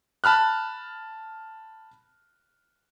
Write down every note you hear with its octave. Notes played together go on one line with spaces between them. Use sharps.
A5 B5 F6 F#6